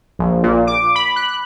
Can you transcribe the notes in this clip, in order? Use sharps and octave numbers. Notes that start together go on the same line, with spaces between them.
A#1
A#2
D6
B5
F#6